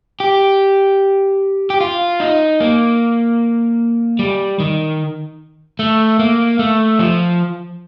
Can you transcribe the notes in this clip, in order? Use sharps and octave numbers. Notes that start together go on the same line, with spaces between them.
G4
G4
F4
D#4
A#3
G3
D#3
A3
A#3
A3
F3